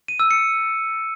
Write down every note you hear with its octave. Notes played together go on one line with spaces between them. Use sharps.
D#7
E6
C#7